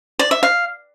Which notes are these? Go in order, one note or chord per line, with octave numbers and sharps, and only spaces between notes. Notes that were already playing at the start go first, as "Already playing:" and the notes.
D5
E5
F5